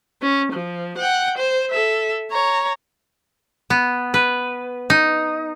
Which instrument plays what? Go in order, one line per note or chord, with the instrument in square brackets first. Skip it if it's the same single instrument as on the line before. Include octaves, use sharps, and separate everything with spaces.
[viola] C#4
F3
F#5 G5
C5
A4 E5
C#5 A#5
[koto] B3
B4
D#4